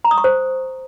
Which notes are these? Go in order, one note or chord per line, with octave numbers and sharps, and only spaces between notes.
A#5
D#6
C#6
C5